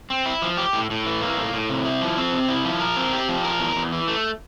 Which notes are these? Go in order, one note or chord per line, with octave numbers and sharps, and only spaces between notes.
C4
E4
F3
G4
A2
A2
E3
A#3
A2
A2
C3
E4
F3
C4
C3
E4
F3
A#4
C4
G4
F3
A#4
E2
E2
E3
A3